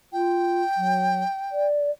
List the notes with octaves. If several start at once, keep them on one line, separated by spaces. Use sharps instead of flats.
F4 G5
F#3
D5